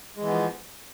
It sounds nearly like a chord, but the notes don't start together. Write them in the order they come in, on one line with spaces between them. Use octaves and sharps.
G#3 E3 B3 F3